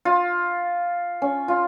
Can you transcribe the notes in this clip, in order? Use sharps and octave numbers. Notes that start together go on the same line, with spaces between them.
F4
C#4
F4